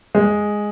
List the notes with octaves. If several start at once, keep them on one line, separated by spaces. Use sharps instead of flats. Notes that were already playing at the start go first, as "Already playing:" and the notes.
G#3